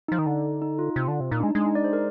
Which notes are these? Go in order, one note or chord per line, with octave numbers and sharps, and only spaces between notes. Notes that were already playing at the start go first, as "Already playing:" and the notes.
F3 D#4
D#3
D3
D#4
F4
C3
D3
C3
A#2 D#4
G#3 D4
D#4
G#3 D4
D#4
D5
C5
A#4